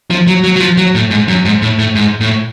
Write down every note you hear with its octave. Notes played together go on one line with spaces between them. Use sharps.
F3
F#3
F#3
F#3
F3
F#3
A2
G#2
F#2
G#2
A2
A2
G#2
A2